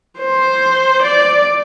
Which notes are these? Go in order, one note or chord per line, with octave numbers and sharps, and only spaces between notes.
C5
D5